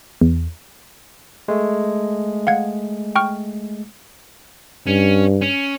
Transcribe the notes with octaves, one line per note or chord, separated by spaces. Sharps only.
E2
G#3 A3
F5 F#5 G#6
G5 C#6 F6
G2 C#4
C#4